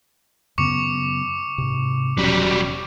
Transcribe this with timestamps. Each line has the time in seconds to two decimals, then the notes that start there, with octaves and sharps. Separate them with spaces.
0.58 F#2 C#3 B3 C#6 D6 C#7
1.58 G#2 C3
2.18 E1 B2 F#3 G3 C#4